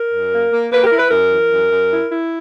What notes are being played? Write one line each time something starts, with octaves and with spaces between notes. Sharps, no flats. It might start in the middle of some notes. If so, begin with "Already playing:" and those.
Already playing: A#4
F#2
A#3
A#3
A#3 B4
G4
A#4
E4
B4
F#2 A#4
E3
F#2
F#2
E4
E4